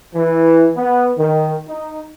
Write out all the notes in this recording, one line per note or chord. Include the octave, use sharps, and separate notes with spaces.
E3
B3
D#3
D#4